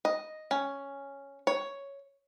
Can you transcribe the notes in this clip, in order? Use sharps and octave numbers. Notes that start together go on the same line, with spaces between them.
D#5
C#4
C#5